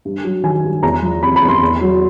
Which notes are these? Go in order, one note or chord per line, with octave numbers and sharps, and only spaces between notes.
G2
F#3
D#3 G#5
G2
E2 A#5
F3
C3 B5
B5
E2
C6
E2
F#3